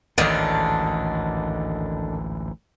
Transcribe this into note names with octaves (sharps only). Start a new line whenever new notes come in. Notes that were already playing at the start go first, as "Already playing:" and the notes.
A1 D2 G#2 D3 D#3 D4